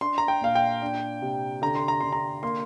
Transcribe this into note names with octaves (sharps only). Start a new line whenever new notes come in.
D4 C6
A#5
G5
A#2 F5
G5
D4
C3
D3 A#5
C6
A#5
D3 C6
A#5
A#3 C6